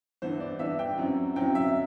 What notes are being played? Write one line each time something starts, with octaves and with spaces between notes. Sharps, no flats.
G2 E3 B3 C5
D5
G2 E3 B3 E5
G5
F#2 F#3 C4 E4
F#2 F#3 C4 E4 G5
E5